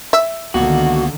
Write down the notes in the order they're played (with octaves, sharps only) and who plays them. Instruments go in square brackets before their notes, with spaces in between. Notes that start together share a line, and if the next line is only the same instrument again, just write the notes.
[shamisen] E5
[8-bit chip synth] C#2 A#3 B3 [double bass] D3 D#3 [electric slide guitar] F#4